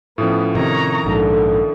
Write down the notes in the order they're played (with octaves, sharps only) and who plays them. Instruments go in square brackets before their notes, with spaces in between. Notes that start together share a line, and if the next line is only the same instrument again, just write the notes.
[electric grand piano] A2 F3 C#4 [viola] B3
[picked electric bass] C3 [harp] D#3 [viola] C#5 A#5
[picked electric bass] A#1 G#2 [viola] D3